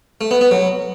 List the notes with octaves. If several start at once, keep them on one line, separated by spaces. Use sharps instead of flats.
A3
B3
B3
F#3